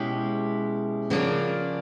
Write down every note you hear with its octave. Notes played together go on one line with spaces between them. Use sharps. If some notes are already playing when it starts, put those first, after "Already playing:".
Already playing: B2 G#3 C#4 E4 G4
C#3 F3 A#3 D4 F#4